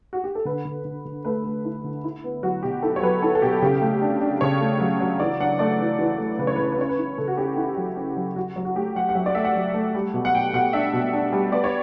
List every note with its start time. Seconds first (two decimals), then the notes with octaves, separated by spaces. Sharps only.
0.13 F#4
0.24 G4
0.35 A4
0.45 D3 B4
0.65 D3
0.85 D3
1.05 D3
1.25 A3 B4
1.44 A3
1.65 E4
1.84 D3
2.04 E4
2.24 B3
2.43 F#3 F#4
2.63 B2 G4
2.83 E4 A4
2.96 C#5
3.02 F#3 B4
3.22 E4 A4
3.35 A4
3.42 B2 G4
3.62 C#3 G4
3.82 A3
4.02 D4
4.21 D4
4.41 C#3 C#5
4.61 A3
4.80 F#3
5.00 F#3
5.20 E3 D5
5.40 D4 F#5
5.59 A3 D5
5.79 E3
5.99 E3
6.18 A3
6.39 C#3 B4
6.47 C#5
6.56 C#3 B4
6.64 C#5
6.72 B4
6.79 C#4 C#5
6.89 B4
6.98 E4
7.18 C#3 A4
7.28 F#4
7.37 C#4 G4
7.57 E4
7.77 F#3
7.97 C#4
8.17 F#3
8.36 F#3 F#4
8.56 F#3
8.65 F#4
8.75 A3 G4
8.95 F#3 F#5
9.09 F#5
9.15 F#3 E5
9.26 D5
9.35 A3 E5
9.45 F#5
9.56 F#3
9.74 A3
9.95 G3
10.14 B2
10.25 F#5
10.34 B2 G5
10.53 B2 F#5
10.73 D4 E5
10.93 B2
11.14 D4
11.33 G3
11.52 B3 D5
11.64 C#5